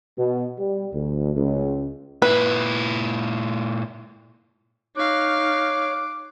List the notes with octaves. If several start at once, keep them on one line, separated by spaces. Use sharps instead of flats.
B2
G3
D2
C#2
A#2 E4 B4
D#4 C#5 F5 D6 F#6